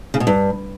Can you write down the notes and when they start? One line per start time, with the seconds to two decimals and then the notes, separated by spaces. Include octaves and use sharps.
0.14 C#3
0.20 B2
0.27 G2